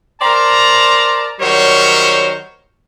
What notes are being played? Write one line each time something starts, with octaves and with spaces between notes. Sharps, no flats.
A#4 C5 D5 A5 A#5
D#3 F#3 G3 A#4 C5 C#5